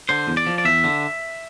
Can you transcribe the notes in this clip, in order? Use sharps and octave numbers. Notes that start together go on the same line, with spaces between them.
D3 C5
E2
D5
F3
D5
E2 E5
D3